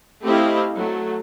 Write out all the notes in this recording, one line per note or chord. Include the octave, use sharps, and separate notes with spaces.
A3 C4 E4 G4 D#5 F5
F#3 A3